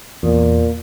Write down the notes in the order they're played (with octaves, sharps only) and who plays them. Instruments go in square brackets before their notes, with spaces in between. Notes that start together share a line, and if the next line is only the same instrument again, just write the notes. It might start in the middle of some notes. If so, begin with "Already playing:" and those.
[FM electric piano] E2 [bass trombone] A#2